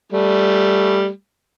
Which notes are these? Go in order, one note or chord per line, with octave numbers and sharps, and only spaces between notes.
G3 A3